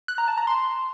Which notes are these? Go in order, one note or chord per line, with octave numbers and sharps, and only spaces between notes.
F#6
A#5
A5
A#5
C6